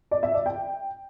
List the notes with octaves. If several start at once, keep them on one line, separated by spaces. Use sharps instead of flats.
D5
E5
D5
G5